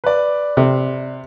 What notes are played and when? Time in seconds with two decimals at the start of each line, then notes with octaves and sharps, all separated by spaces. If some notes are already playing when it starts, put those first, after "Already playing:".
0.04 B4 D5
0.57 C3